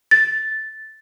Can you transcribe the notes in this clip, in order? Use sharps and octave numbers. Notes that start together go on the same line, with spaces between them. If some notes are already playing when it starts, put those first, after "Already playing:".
A6